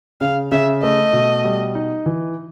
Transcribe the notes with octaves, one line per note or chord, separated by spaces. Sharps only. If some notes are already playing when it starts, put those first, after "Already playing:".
C#3 F5
C#3 E5
A3 D#5
B2
G3
D#4
E3